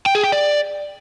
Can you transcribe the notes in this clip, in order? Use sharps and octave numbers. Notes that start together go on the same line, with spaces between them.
G5
G#4
G5
D5